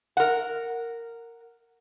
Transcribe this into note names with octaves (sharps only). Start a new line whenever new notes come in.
A#4 F#5